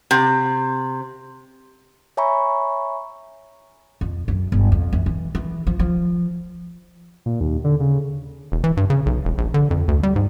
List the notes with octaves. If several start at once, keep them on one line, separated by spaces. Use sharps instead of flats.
C3
C#5 E5 G#5 A#5 B5 C#6
F2
F#2
G1
F2
E3
E3
E3
F3
F3
A#2
D#2
D3
C#3
E1
E3
G2
C#3
B1
E1
A#1
D3
F2
D2
G3
G#2